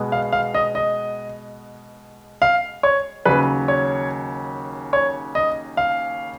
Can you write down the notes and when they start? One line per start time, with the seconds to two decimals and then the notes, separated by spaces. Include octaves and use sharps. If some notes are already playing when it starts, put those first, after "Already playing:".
Already playing: B2 G#3 B3
0.12 F5
0.32 F5
0.54 D#5
0.75 D#5
2.42 F5
2.83 C#5
3.25 D#2 C#3 F#3 B4
3.68 C#5
4.93 C#5
5.35 D#5
5.77 F5